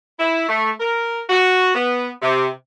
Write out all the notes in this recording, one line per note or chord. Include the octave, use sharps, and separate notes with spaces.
E4
A3
A#4
F#4
B3
C3